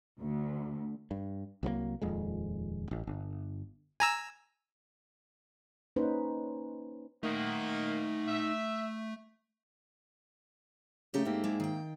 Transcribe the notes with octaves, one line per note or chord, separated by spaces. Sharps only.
D2
G2
C2 F#3 G3 A#3
D#1 F2 G#3
A1
G1
G#5 A#5 E6
A#3 C#4 D#4 B4 C5
D#3 A3 A#3 D#4 F#5
E5
C#3 A3 D#4 G4 A4
G#2 A#3 C4 E5
G#3 D4 E4
D#3 G5